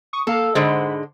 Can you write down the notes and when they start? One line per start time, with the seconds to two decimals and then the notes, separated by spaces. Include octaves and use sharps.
0.13 C#6 D#6
0.27 A#3 A4 F5
0.55 G#2 D3 G#3 C5 F#5 B5